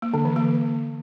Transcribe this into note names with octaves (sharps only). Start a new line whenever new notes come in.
A#3
D3
E3
A#3